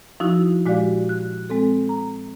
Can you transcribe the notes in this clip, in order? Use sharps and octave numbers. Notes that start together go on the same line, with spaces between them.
F3 D#4 E4 F#4
A#2 G#3 F#4 G4 D5 F5
F#6
G#3 C4 A4
A#5